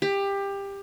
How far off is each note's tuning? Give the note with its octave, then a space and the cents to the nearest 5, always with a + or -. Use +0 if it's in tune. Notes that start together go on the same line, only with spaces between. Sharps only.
G4 +20